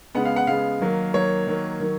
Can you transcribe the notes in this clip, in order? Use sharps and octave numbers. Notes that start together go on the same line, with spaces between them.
C#3 G#3 B3 F#5
F5
F#5
C#3 G#3 B3 F5
D#3 F#3 A#3
D#3 F#3 A#3 C#5
D#3 F#3 A#3
D#3 F#3